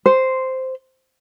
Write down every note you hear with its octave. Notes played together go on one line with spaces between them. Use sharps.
C5